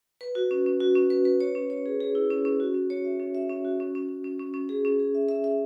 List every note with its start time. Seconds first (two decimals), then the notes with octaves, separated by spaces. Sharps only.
0.21 B4
0.35 F#4
0.51 C#4
0.66 C#4
0.80 F#4
0.96 C#4
1.10 B4
1.25 B4
1.40 C#5
1.55 C#4
1.70 C#5
1.86 G#4
2.01 G#4
2.15 E4
2.30 C#4
2.45 C#4
2.60 F#4
2.74 C#4
2.90 C#5
3.05 E5
3.20 C#4
3.35 E5
3.50 C#4
3.65 F#4
3.80 C#4
3.95 C#4
4.09 C#4
4.24 C#4
4.40 C#4
4.54 C#4
4.69 G#4
4.85 C#4
4.99 G#4
5.15 E5
5.29 E5
5.44 E5